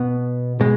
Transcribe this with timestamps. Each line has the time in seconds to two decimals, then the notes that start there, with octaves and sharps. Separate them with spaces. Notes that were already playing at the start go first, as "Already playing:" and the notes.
Already playing: B2 B3
0.61 B2 G#3